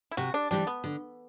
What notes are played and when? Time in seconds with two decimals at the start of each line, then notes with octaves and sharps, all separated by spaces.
0.11 E4
0.17 C3 F#4
0.34 D4
0.51 E3 G3 C4 D4
0.67 B3
0.84 D3